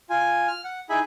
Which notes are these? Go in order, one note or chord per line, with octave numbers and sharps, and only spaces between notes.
F4 G#5
F6
F#5
D#4 E4 G#4 E5 G#5 B5